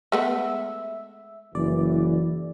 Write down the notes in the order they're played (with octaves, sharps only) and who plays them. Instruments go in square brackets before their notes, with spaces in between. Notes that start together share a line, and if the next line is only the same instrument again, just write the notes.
[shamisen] G#3 A3 B3 [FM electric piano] E5
[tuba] F#1 [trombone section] E3 [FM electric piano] D5